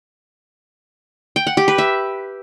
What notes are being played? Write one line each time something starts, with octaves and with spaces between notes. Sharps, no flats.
G5
F#5
G4
B4
E5